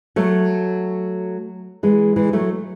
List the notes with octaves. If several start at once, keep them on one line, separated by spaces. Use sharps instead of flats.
F#3 A3
E3 G#3
E3 G#3
F#3 A3